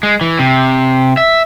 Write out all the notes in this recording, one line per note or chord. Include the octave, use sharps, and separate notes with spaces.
G#3
E3
C3
E5